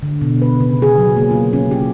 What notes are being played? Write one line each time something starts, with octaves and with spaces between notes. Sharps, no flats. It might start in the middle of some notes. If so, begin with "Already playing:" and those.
D3
B2
B4
C#3
G#4
F#3
A#3
F4
C#4
G4